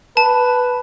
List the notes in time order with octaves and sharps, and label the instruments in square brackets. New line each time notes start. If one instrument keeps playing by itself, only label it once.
[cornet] B4 [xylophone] A5